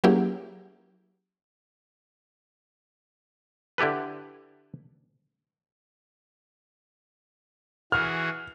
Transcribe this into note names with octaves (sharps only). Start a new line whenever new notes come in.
F#3 A#3 C#4 E4 G4 G#4
D3 E4 G4 A4 B4
E3 F#4 G#4 F6